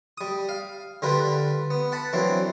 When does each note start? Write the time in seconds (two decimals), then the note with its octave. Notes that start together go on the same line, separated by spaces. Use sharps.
0.18 G3 D#6
0.49 F5
1.02 D3 G3 F4 A#4 B4
1.70 B3
1.92 F#5 A5 B5
2.13 E3 F#3 A#3 C4 D4